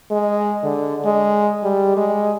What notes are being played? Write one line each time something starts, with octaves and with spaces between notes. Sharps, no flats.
G#3
D3
G#3
G3
G#3